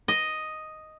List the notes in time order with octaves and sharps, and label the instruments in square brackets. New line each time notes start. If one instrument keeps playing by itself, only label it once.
[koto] D#5